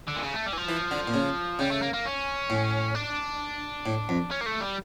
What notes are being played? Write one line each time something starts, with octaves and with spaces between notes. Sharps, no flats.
D3
A#2
C#3
A3
G3
E3
F3
E3
D3
A#2
C#3
C#3 G3
A3
A#3
A#3
C#4
A2
D4
A2
F2
C#4
A#3
A3
G3